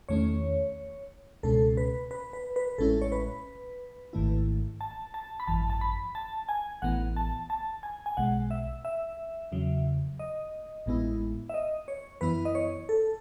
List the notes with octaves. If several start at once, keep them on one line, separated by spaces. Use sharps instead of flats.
E2 D#3 A3 C#4 C#5
C#2 B2 G#3 C#4 A4
B4
B4
B4
B4
A1 A2 G#3 C#4 E4 A4
C#5
B4
G#1 G#2 D#3 A3 E4
A5
A5
B5
G#1 F#2 E3 A5
A5
B5
A5
G#5
A1 A2 E3 B3 F#5
A5
A5
G#5
G#5
B1 B2 G#3 F#5
E5
E5
E2 C#3 F#3
D#5
A1 A2 G#3 B3 E4
E5
D#5
C#5
F#2 E3 B3 E4 B4
D#5
C#5
A4